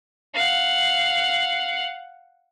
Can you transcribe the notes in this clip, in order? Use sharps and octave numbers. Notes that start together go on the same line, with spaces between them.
F5 F#5